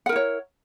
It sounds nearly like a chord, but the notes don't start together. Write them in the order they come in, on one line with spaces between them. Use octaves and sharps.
F#5 A#4 E4 C#5